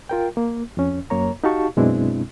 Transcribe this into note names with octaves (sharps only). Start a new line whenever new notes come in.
F4 A#4 G5
A#3
F2 C#4
F#2 A#3 C#5 A#5
D#4 F#4 G4 F5 A5 C#6
F#2 B2 G#3 C4 D4 E4